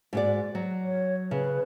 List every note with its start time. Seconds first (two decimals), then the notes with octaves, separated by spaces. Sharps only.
0.13 G#2 F#4 D5
0.55 F#3
0.84 C#5
1.31 C#3 B4